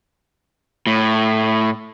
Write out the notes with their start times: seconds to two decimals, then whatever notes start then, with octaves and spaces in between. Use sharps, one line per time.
0.87 A2